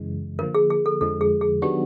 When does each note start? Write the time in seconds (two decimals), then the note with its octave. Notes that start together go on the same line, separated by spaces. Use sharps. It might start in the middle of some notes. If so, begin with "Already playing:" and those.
Already playing: F#2 C#3 E3 G#3
0.39 D3 F3 A#3 A#4
0.55 G#4
0.70 G#4
0.86 A4
1.01 F2 D3 F3 G#3 A4
1.21 G#4
1.41 G#4
1.62 D#3 F#3 B3 D4 F#4 G4